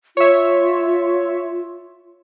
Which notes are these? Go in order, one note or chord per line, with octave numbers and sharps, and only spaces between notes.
F4 C#5 E5